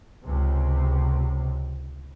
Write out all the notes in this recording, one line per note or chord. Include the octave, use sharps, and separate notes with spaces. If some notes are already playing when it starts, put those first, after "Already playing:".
C#2 C3